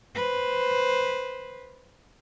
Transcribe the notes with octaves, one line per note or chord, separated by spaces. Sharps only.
B4 C5